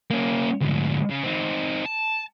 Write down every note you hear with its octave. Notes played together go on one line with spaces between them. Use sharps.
A#3 C#4
D2 G#2
C#3
C4 D#4
A5